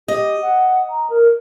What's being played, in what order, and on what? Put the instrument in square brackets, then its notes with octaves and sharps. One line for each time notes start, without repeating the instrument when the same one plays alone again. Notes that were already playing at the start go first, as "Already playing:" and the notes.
[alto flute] G4 [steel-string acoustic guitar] D#5
[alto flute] F#5
A#5
A#4